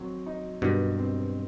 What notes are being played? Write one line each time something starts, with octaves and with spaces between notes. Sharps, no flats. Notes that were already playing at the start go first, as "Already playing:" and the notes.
Already playing: D#3 F#3 C4
D#4
G2 B2 D#3
C4